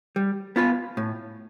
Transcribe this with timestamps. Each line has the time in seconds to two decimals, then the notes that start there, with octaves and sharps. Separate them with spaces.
0.16 G3
0.56 B3 F4 B4
0.97 A2